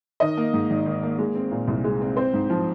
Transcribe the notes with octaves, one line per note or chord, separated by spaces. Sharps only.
D#3 D#5
A#3
G#2
G#1
D#3
A#3
G#3
C4
A#2
C2
G#3
C4
C4 C5
G#2
F3